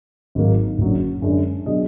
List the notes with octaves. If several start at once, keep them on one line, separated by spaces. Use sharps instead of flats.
G#1 G#2 F#3 A#3
F#1 F#2 D3 F#3 D4
F#2 D3 G#3 D4
B2 F#3 D4 G#4 D#5